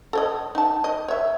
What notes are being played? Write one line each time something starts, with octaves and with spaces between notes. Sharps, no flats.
A4 C#5 D#5
D#4 A5
D#5
C#5 E5